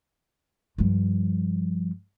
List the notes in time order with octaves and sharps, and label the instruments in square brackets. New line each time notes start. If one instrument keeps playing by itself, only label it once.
[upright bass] G2 F3